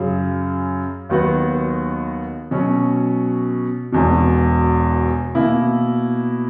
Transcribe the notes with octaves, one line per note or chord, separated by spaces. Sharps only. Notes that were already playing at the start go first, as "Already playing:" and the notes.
Already playing: F#2 C#3 F#3
D#2 D#3 F#3 B3 F#4
B2 F#3 C#4
E1 E2 B2
B2 A#3 E4